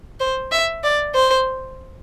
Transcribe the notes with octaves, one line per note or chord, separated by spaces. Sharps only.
C5
E5
D5
C5